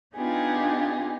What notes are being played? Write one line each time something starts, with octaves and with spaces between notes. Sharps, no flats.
B3 D4 D#4 F4 G4 G#4